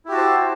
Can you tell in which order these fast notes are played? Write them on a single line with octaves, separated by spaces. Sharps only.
E4 G4 F#4 A5 C5